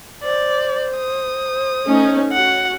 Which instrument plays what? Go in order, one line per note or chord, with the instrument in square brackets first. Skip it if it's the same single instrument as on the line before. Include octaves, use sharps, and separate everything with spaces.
[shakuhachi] C5 [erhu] D5
[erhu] D#6
[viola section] A3 C#4 D#4
[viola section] C#4 F#4 [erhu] F#5